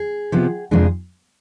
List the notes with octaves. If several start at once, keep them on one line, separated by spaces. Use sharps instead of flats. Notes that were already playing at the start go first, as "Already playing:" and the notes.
Already playing: G#4
C3 F3 B3
F2 C3 F3 G#3 D4 G#4